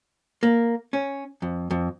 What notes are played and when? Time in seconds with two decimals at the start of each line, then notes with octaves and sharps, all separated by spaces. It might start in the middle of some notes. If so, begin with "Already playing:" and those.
0.43 A#3
0.93 C#4
1.42 F2
1.71 F2